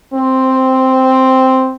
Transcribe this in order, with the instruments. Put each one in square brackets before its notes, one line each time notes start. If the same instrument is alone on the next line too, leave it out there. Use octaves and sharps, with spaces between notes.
[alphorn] C4